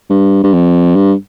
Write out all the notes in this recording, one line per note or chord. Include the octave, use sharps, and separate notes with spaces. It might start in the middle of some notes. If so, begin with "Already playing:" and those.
G2
G2
F2
G2